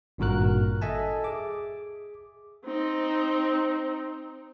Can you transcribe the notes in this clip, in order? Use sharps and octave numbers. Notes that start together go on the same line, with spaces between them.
G#1 G2 A#2 F#4 A#4 F#6
A4 D#5 E5 G#5 A5
G#4 D6
C4 D#4